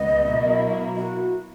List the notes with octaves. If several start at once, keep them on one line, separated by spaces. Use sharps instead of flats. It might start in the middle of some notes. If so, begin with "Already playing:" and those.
Already playing: C#2 B3 D#5
B2 F#3 A#3 E4
F#4